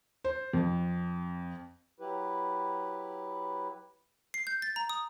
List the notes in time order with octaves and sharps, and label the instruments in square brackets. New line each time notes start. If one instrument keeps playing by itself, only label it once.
[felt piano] C5
F2
[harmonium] F#3 E4 G4 B4
[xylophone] C7
G6
A6
A#5
D#6